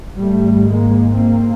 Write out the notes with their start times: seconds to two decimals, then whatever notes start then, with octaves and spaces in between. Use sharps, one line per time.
0.17 G#1 G#2 G3 A3
0.67 G#3 A#3
1.16 A#3 C4